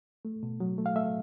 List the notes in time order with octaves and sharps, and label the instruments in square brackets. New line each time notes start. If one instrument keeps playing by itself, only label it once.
[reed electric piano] A3
B2
F#3
A3
F5
A3 E5